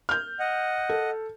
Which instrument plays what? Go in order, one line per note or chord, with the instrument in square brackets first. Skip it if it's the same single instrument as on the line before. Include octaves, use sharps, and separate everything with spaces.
[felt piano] F6 G6
[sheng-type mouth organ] D#5 F#5
[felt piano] A4